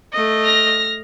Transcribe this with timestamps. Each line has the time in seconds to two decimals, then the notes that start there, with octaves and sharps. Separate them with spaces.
0.12 A3 D#5
0.45 F6 A#6